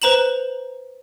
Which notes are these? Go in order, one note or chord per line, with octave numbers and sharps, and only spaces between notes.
B4 C5 A#5 E7 F#7